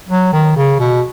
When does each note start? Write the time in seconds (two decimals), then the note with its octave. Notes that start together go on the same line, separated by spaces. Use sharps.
0.09 F#3
0.33 D#3
0.56 C#3
0.79 B2